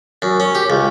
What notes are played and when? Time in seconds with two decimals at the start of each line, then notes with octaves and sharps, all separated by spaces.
0.22 F#2
0.40 C#4
0.55 G4
0.70 C#2